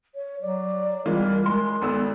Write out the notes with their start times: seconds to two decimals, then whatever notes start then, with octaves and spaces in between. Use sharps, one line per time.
0.15 C#5
0.42 F#3 D5
1.06 E3 G3 G#3 F4 A#4
1.46 G#3 C6
1.81 G#1 B3 A4 E6